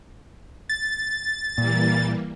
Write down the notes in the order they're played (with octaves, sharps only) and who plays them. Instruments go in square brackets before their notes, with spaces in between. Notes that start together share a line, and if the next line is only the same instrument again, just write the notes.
[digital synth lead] A6
[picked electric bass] A#2 [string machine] E3 G3 A#3